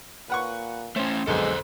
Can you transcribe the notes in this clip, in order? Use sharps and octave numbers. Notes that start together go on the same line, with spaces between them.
A#2 B4 F#5 C#6
A3 C#4 C5
B1 F2 D3 G#3 A4 C5